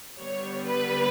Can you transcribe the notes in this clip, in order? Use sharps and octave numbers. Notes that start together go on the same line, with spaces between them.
D3 G3 B3 C#5
B4